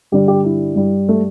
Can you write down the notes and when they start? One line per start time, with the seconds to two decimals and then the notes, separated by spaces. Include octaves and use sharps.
0.12 G2 D3 G3 G4
0.28 G4
0.44 E4
0.76 G2 G3
1.09 A3